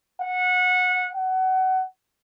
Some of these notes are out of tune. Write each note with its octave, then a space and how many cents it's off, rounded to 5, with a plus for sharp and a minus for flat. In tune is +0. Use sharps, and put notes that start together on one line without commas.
F#5 -20
F#5 +25